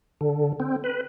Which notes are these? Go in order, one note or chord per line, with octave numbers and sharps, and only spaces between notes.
D3
C4
B4